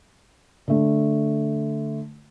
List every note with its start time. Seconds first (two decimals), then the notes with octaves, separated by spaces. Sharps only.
0.68 D3 A3